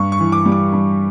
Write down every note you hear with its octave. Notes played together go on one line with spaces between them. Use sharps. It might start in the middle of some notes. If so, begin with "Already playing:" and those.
Already playing: G2 C#6
C#6
E3
D6
G3
D6
G2